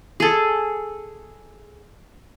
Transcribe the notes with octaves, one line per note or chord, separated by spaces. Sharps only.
G#4 A4